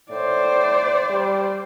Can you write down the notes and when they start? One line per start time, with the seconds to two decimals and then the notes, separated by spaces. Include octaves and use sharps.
0.11 A2 C5 D5
1.10 G3